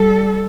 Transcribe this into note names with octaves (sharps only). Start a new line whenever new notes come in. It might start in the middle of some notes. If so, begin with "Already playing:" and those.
Already playing: G3 A4